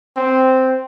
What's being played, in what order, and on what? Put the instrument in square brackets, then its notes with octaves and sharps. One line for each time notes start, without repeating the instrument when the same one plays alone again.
[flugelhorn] C4